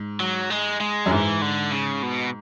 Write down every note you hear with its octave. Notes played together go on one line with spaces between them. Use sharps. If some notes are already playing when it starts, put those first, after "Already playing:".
Already playing: G#2
F#3
G#3
G#3
F#2
G#2 E3
D3
C#3
B2